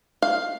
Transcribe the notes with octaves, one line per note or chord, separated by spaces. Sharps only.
F5